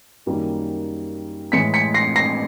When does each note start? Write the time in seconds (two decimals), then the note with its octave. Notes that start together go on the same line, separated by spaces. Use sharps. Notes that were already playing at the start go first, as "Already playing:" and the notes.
0.26 F#2 D#3 G3 A#3
1.52 A2 E3 G#3 B6 C#7
1.74 B6 C#7
1.94 A#6 C7
2.16 A#6 C7